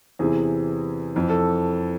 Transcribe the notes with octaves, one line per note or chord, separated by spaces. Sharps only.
E2 C3 E3 G#4
F2 E3
A4